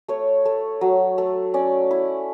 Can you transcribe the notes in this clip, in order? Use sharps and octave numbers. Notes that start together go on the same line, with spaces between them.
A3 C#5
A3
F#3
A3
C#4 D5
E4